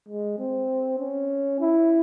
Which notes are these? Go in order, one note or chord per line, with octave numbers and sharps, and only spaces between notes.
G#3
C4
C#4
E4